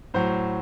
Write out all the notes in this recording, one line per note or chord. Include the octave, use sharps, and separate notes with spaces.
A2 F#3 C5